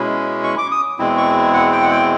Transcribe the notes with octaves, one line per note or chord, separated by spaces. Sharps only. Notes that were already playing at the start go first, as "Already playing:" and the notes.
Already playing: B2 G#3 C#4 E4
C#6
D6
D#6
E2 B2 G#3 C4 E4
C#6
F#5
G5
F#5
G5